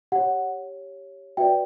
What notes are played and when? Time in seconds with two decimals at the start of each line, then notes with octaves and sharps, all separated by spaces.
0.12 G4 C#5 F#5
1.37 F#4 B4 D5 E5 G5